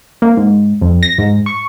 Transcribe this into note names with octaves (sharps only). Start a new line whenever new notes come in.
A#3
G#2
F2
A#6
G#2
C#6